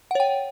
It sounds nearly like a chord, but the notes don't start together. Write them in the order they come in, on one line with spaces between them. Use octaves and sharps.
F#5 C#5 G5